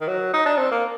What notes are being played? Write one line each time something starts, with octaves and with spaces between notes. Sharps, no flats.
D#3
F#3
D#4
D4
C4
A#3